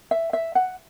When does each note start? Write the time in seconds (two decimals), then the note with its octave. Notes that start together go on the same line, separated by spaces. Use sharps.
0.11 E5
0.33 E5
0.55 F#5